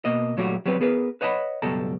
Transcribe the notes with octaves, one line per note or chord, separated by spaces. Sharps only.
B2 A#3 D#5
A#2 F#3 G3 A3 F#4
F#3 G3 C4 B4
B3 G#4 A#4 B4
B4 C#5 D#5 F#5 G#5 B5
C#2 F#2 B2 G3 A4 A#5